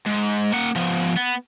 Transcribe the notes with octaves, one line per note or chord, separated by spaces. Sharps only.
G#2
A#3 F#5
F3 B3
B3